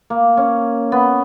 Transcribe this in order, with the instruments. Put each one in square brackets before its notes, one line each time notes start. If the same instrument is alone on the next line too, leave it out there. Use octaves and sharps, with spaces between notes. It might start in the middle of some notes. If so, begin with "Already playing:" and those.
[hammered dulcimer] A#3
C#4
B3